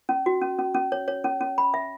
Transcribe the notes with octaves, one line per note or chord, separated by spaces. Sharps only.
C#4
F#4
C#4
C#4
C#4
C#5
C#5
C#4
C#4
B5
E5